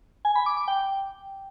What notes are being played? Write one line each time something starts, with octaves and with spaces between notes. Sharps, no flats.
G#5
B5
D6
D6
G5